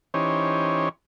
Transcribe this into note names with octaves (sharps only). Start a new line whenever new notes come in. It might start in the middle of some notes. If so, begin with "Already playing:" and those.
E3 C#4 D#4 G4 C5 C#5